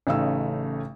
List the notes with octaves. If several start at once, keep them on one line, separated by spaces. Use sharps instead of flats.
A1 C#3 A3 D#4 F5 E6